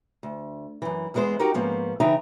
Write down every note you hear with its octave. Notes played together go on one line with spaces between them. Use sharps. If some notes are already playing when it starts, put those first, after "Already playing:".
D2
F#2 E3
E2 E3 G#3 B3 C5
D#4 F#4 G4 A#4 F#5 G5
G#2 F3 A#3 B3 C#4
C#3 E3 D#4 E5 G5 A#5